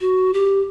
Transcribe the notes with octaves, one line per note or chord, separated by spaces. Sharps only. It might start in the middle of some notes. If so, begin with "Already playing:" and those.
F#4
G4